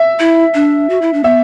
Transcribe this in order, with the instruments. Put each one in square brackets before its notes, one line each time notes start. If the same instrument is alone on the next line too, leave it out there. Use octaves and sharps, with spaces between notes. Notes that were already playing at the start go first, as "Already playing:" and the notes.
Already playing: [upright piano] E5
[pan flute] E4
D4
F#4
E4
D4
[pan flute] B3 [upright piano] E5